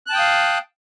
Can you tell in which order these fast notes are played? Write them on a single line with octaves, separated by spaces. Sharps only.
F#6 A5 G5 D#6 F5